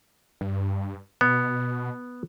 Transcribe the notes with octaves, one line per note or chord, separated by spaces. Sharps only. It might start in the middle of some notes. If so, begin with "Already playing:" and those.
G2
B2 B3